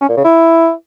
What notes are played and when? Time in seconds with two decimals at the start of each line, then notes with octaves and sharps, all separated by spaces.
0.01 C#4
0.09 A#2
0.17 C#3
0.25 E4